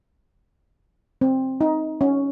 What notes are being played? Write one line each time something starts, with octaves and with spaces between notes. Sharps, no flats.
C4
D#4
C#4